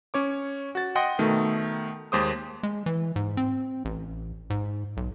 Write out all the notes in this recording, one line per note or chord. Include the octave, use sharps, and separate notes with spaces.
C#4 C#5 D6
F#4 A6
D#5 F#5 G5 C6 D#6 A#6
B2 D#3 A3 D#4
D#2 G#3 C5 D6 D#6
G#3
E3
G#2
C4
A1
G#2
B1